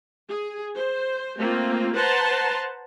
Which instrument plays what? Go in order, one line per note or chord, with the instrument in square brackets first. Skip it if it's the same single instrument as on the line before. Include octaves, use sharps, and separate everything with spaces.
[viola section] G#4
C5
A3 A#3 C4 F4
B4 C5 F#5 A5 A#5 C6